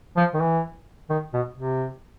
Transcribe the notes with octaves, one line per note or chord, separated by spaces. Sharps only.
F3
D#3
E3
D#3
B2
C3